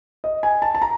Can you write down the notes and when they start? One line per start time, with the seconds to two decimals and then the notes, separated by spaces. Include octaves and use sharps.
0.24 D#5
0.43 G#5
0.62 A5
0.75 A5
0.82 A#5